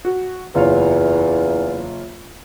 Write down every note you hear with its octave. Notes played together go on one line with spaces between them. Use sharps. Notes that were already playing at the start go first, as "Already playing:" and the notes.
F#4
F#1 E2 F4 C#5